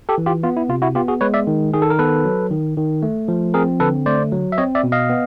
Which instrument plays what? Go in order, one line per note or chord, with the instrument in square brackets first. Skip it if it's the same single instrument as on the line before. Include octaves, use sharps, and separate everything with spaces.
[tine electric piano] G4 A4
E3
F4 G4
B3 F4
E4
C3 F4
E4 F#4
B3 F4 G4
F#4 G#4
G#3 B4 C#5
D5 E5
D#3
D#3 G#4
A4
A#4
B3 A4 B4
F#3
D#3
D#3
A3
F3
C4 G#4 A#4
D3 A4 B4
A3 C5 D5
F#3
E5
C4 C#5 D#5
D5 E5
B2
D#5 F5
B3